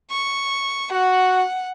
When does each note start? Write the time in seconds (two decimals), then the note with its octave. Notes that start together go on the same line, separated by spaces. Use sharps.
0.10 C#6
0.91 F#4 F#5